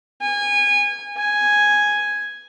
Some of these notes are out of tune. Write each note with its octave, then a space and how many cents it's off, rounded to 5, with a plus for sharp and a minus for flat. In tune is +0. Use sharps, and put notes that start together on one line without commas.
G#5 -25
G#5 +0